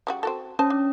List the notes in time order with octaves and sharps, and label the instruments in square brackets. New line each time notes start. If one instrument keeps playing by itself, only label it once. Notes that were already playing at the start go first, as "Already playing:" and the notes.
[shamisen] C#3 G3 F#4
C4 F#4 A4
[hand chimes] C#4 [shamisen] C5 A5
[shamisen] D4